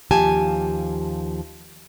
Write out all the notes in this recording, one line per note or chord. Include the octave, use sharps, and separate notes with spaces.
D#2 F3 G4 G#5 A5